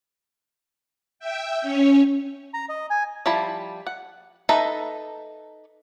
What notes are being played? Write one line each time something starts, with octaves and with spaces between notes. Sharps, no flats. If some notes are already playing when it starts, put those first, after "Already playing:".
E5 G5
C#4 C#5
A#5
D#5
G#5
F3 G3 E4 A5 B5
F#5
D#4 A4 B4 E5 A#5